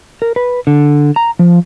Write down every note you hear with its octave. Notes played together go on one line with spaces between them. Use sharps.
A#4
B4
D3
A#5
F3